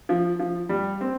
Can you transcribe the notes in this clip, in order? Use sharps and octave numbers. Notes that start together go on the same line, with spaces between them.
F3
F3
G3
C4